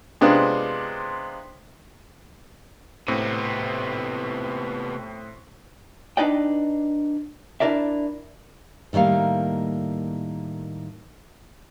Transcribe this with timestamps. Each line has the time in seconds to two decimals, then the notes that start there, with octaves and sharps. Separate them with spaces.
0.21 C3 G#3 B3 D4 F4 C5
3.08 A2 C3 B3 C4
6.17 D4 D#4 B4 D5 D#5 G5
7.60 D4 E4 A#4 D5 E5
8.93 A2 D#3 G3 A#3 F5